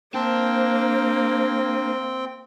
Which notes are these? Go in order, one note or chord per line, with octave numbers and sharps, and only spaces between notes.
A#3 C4 D4 C5 G5 A5